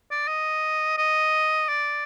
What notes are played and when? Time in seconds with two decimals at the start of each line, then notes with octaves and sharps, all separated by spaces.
0.11 D5
0.28 D#5
0.98 D#5
1.68 D5